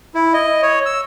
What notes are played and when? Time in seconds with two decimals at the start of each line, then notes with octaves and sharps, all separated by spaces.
0.15 E4
0.34 D#5
0.62 C#5
0.86 E6